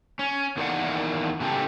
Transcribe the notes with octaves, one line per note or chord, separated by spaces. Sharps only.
C#4
E2 D#3 A#3 C4 D5 F#5
A2 C#3 G#3 F#4 G4 A4